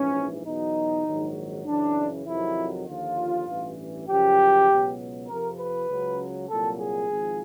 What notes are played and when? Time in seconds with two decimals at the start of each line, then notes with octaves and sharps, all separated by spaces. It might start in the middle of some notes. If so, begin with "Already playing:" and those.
Already playing: A#1 G#2 E3 C#4
0.45 E2 B2 F#3 D#4
1.05 A#1 G#2 D#3 F#3
1.66 F#2 C#3 E3 D4
2.26 F2 C3 D#3 F#3 E4
2.86 D#2 D3 F3 F4
3.48 A1 G2 E3
4.07 F#2 C#3 F3 G4
4.68 C#2 B2 F#3
5.28 F2 C3 F3 A#4
5.58 B4
5.89 C#2 C#3 F#3
6.49 C2 A#2 F#3 A4
6.79 G#4
7.09 G#1 G#2 F3